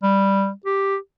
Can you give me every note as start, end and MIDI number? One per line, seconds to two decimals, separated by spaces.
0.03 0.51 55
0.66 0.96 67